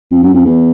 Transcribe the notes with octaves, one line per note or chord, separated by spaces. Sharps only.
F2
F#2
F2
E2